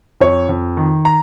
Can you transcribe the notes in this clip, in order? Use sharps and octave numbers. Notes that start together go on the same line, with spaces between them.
F2 C#5
F2
D#3
A#5